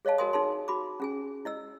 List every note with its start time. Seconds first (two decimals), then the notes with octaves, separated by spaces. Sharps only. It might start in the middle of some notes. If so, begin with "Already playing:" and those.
0.05 G#4 C#5 D#5 F5 A5
0.18 F#4 A#4 D#5 G#5 C6 D#6
0.33 D#4 G#4 A5 C6
0.68 F#4 B5 D6
1.00 C#4 G#4 G#5
1.45 E4 D#5 E6